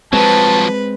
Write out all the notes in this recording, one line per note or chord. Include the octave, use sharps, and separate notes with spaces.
F3 F#3 G#3 C4 B4 A5